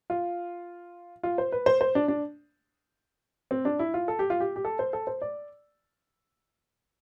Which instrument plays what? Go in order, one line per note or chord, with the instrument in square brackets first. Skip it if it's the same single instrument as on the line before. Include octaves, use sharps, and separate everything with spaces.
[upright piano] F4
F4
C5
B4
C5
C5
D4
D4
C4
D4
E4
F4
A4
G4
F4
G4
G4
A4
C5
A4
C5
D5